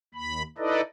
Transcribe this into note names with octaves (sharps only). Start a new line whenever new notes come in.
D#2 B5
D#4 E4 A4 B4 D5 D#5